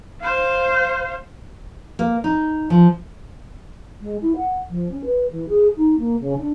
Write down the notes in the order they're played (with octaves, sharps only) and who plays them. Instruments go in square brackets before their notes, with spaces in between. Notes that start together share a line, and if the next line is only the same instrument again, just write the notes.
[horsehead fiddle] C5 F5
[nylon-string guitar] A#3
D#4
F3
[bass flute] G#3
E4
F#5
F3
C#4
B4
E3
G#4
D#4
A#3
C#3
D4